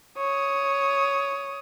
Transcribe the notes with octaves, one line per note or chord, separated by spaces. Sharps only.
C#5 D#6